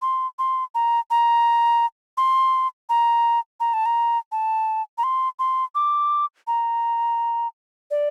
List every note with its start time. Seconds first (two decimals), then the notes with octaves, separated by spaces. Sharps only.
0.02 C6
0.39 C6
0.75 A#5
1.10 A#5
2.17 C6
2.89 A#5
3.60 A#5
3.73 A5
3.86 A#5
4.32 A5
4.98 A#5
5.03 C6
5.39 C6
5.75 D6
6.47 A#5
7.91 D5